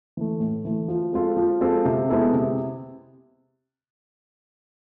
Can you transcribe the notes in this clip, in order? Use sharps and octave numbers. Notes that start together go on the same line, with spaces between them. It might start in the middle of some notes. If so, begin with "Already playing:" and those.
E3 A3
A2
E3 A3
F3
G#3 C4 F4 A4
F3
G#3 C4 F4 A4
C3
G#3 B3 E4 A4
C3